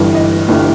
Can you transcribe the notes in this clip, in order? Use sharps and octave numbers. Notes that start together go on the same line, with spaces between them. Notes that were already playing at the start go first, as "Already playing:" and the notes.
Already playing: G1 G2 E3
D#5
G1 G2 E3